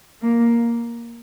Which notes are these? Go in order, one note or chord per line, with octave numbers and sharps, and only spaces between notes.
A#3